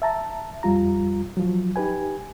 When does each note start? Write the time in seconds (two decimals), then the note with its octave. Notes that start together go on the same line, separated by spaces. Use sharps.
0.02 E5 A5 A#5
0.63 F2 G3 F4 A#5
1.37 F3 F#3
1.76 D#4 G4 B4 G#5